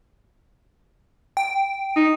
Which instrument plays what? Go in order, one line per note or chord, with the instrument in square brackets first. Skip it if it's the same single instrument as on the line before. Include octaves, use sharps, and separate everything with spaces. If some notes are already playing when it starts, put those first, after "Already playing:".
[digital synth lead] G5
[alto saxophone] D#4